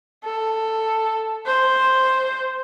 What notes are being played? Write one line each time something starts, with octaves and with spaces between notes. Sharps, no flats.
A4
C5